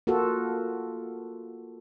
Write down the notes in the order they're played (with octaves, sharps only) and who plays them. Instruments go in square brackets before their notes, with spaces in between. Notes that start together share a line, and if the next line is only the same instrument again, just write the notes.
[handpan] A#3 F4 F#4 A4